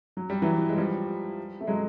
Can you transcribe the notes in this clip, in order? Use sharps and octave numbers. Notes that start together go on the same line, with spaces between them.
F#3
G3
E3 F#3
G#3
F3 G3
A3
F#3 G#3